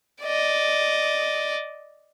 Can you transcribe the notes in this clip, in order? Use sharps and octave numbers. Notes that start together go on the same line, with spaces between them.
D5 D#5